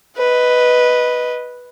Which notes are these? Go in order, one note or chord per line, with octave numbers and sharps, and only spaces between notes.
B4 D#5